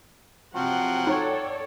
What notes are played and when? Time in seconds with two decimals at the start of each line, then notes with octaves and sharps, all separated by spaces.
0.55 C3 F3 F#3 F#5 G5
1.07 D#4 A4 C#5 D5